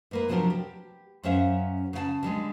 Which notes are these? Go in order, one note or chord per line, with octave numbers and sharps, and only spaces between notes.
G#2 A#3 B4
C3 F3 F#3 D4 G4 A#4
G4
F#2 F#3 C#4 C5 E5 F5
C#3 F5 A5
D3 G3 G#3